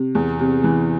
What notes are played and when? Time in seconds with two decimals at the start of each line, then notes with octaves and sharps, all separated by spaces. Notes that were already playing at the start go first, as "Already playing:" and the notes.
Already playing: C3
0.15 E2
0.39 C3
0.64 E3